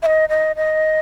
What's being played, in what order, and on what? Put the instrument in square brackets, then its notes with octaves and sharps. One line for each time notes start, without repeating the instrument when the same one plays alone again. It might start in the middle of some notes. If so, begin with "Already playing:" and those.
[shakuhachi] E5
D#5
D#5
D#5